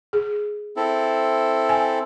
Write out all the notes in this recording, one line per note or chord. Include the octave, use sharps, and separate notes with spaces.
G#4
C4 E4 A4
G#5